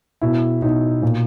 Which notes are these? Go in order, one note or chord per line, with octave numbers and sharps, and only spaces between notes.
B2 E4
B2 D#4
A#2